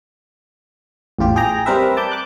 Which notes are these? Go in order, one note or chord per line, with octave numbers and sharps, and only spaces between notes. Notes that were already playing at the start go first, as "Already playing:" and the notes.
A1 E2 F4 G4
G#4 G5 A#5
G3 C4 A#4 B4 E5
A5 D6 G6
D6 F#6